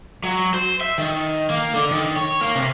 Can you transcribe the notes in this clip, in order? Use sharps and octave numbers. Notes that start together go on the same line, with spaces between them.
F#3
C5
E5
D#3
A#3
D3
D#3
C#5
A#3
C3